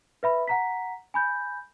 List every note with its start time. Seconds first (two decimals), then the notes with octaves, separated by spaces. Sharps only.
0.23 B4 E5 B5
0.48 F#5 A#5 B6
1.14 G#5 B5 G6